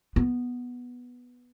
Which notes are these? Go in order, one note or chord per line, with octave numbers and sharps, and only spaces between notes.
B3